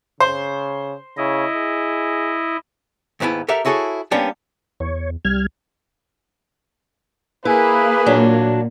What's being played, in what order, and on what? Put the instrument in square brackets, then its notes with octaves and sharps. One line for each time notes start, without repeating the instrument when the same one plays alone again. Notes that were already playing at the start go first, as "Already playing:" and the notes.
[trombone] C#3 [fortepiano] C5
[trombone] C#3 [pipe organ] E4 D#5
[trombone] G#4
[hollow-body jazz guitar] D#2 G#2 B3 E4 A5
G4 A4 A#4 E5 F#5
E4 F#4 G#4 A4 C#5
G3 A#3 B3 C#4 D4 G4
[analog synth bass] E2 [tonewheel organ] C#5
[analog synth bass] C2 [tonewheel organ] G3 F6 G#6
[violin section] A#3 [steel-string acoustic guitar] E4 [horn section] G#4 B4
[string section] A#2 [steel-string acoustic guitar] F#3 D4